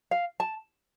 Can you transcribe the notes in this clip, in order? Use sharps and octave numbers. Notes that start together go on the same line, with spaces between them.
F5
A5